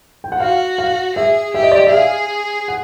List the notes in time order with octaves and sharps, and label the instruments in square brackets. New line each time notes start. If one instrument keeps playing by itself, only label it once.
[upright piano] G5
F#5
[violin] F#4 [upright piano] F5
[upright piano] F5
[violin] G#4 [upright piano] E5
[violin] G4 [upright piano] E5
[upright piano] D#5
D5
D#5
E5
[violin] G#4 [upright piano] F5
[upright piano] F#5